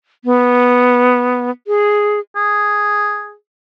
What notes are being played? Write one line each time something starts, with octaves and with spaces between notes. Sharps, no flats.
B3
G#4
G#4